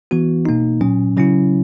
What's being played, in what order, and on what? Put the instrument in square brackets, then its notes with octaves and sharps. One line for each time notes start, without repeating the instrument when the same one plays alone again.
[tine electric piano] E3 B3 F#4
B2 A#3 D#4
A#2 F#3 C#4
C#3 F#3 C#4 E4